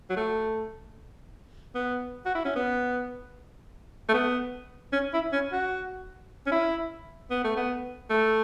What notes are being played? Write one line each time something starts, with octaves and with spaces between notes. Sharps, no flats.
F#3
A3
B3
F#4
E4
C#4
B3
A3
B3
C#4
E4
C#4
F#4
C#4
E4
B3
A3
B3
A3